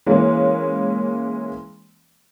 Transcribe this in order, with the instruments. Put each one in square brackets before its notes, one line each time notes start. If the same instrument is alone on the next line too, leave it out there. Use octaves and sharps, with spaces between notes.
[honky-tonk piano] E3 G#3 A#3 C#4